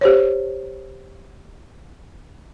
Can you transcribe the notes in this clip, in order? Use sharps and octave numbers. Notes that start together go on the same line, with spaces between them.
G4 C5 C#5